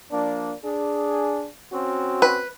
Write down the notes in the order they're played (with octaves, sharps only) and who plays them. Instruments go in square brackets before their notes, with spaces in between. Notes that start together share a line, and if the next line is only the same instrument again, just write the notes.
[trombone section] F3 A#3 D4
D4 G#4
C4 C#4 F#4
[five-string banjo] B4